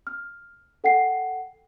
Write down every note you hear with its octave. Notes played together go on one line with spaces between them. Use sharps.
F6
A4 F#5 G5 C7